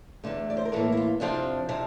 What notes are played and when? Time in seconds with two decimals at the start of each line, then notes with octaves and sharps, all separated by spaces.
0.24 E2 D3 A3
0.50 D5
0.57 C5
0.65 A#4
0.72 A2 E3 A#3 A4
0.92 E4
0.97 F4
1.20 F2 C3 F3 C4 D4
1.69 C3 F3